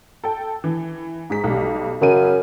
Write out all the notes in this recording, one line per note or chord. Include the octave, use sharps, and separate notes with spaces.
A4 G5
E3
G#2 G#4 B6
B1 G3
F#2 C#3 D#7